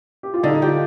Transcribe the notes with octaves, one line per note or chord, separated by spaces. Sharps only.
G4
F4
D3 D#4
F4 G4